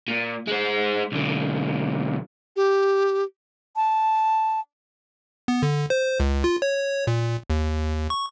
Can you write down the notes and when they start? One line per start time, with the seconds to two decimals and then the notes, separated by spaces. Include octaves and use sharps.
0.08 A#2
0.47 G#3 C5
1.12 B1 D3
2.56 G4
3.76 A5
5.48 B3
5.63 D3
5.90 C5
6.20 C#2
6.44 F4
6.62 C#5
7.07 A#2
7.50 D#2
8.10 C#6